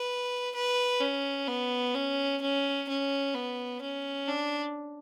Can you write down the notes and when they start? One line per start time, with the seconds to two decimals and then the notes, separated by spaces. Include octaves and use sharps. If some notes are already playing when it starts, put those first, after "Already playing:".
Already playing: B4
0.55 B4
1.01 C#4
1.48 B3
1.94 C#4
2.41 C#4
2.88 C#4
3.35 B3
3.81 C#4
4.28 D4